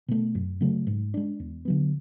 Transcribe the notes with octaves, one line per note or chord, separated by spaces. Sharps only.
B2 A3
F#2
C#3 F#3 A3
G#2
G#3 D4
E2
D3 F#3 B3